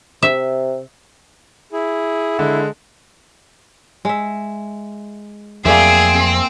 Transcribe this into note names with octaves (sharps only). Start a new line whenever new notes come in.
C3 E5
E4 G#4
D3 G#3
G#3 E5
F2 F#3 A3 A#3 C4 G#4 D5 E5